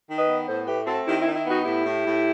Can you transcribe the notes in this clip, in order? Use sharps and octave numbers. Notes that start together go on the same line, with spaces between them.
D#3
B4 D#5
B3
A2 A4 C5
A3 G4 B4
C4 F#4 A4
D#3 E4 G4
E4
D#3
E4
B3 D#4 F#4
A2 E4 G4
A2
A2